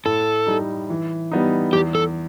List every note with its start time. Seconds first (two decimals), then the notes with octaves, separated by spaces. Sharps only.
0.05 A2 A4
0.47 G3 D#4
0.90 E3
1.32 G3 B3 D#4
1.73 E2 G4
1.95 A4